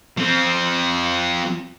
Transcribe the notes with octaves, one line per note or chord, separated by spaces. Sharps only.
F3 C4